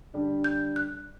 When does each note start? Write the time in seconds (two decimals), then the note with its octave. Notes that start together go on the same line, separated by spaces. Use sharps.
0.13 D3 G3 D4 G4
0.44 G6
0.76 F#6